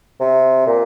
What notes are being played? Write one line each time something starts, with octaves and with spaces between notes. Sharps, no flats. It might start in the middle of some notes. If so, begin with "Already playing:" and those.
C3
A#2